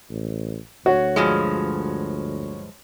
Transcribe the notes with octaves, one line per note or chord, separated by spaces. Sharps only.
A1
D2 F#4 C#5 F#5
G2 F3 G#3